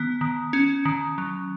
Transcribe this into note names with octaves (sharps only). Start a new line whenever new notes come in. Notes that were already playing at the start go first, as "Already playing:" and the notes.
Already playing: D#3 B3
D#3
C#4
D#3
F#3